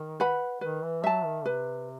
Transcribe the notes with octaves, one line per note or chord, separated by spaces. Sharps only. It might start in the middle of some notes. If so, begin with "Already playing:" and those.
Already playing: D#3
B4 F#5 B5
D#3 B4
E3
F#3 E5 A5
D#3
C3 B4